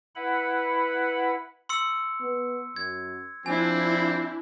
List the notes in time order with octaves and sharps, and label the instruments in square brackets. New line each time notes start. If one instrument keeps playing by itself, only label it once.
[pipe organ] E4 B4 F#5 B5
[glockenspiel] C6 E6 C#7
[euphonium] B3
[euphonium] F#2 [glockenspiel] G#6
[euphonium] F3 [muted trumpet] C4 [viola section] D4 E4 [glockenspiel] G#5